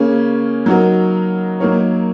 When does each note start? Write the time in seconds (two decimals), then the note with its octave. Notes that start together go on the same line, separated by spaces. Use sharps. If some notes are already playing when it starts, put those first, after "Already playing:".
Already playing: C#3 A#3 C#4
0.66 F#3 D#4 F#4 A#4
1.60 F#3 A#3 D#4 A#4 C#5